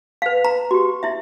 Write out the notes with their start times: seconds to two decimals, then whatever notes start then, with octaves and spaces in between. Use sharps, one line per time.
0.22 B4 F5
0.44 A#5
0.71 F#4 G4
1.03 E4 E5